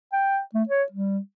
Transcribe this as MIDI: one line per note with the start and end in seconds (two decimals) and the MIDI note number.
0.13 0.40 79
0.55 0.64 57
0.69 0.83 73
0.92 1.19 55